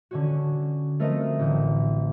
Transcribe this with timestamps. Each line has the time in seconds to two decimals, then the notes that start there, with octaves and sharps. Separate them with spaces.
0.11 D3 C#4 F#4
0.99 F3 A3 C4 A#4 C5 D#5
1.39 A1 D3 G5